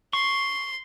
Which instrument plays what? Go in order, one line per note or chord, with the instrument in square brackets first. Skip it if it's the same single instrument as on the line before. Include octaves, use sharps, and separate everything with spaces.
[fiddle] C6 [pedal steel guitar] C#6